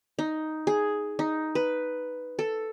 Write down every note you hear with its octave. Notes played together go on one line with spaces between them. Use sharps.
D#4
G#4
D#4
B4
A4